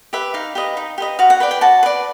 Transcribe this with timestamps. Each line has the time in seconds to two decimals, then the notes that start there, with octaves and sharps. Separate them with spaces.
0.13 G4 B4 E5
0.34 D#4 F5
0.55 G4 B4 D#5
0.77 D#4
0.98 G4 B4 D#5
1.19 F#4 F5
1.30 F#5
1.40 B4 D5 G5
1.51 G5
1.61 F#4 A5
1.83 B4 D5